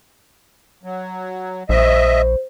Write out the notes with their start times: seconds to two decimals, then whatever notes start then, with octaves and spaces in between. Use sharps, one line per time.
0.83 F#3
1.69 A#1 C5 D#5 E5